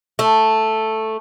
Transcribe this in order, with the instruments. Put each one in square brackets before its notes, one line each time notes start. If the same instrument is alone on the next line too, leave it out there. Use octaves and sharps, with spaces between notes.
[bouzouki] A3